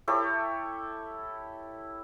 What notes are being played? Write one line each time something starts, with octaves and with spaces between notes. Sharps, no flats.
E4 G4 A4 C#5